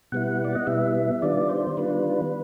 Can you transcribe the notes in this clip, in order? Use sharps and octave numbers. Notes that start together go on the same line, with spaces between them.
B2 G3 B3 E4 F#5
D5
D#5
B2 G3 B3 E4 E5
E5
D#3 G3 B3 D4 F4 D5
C5
D#3 G3 B3 D4 F4 B4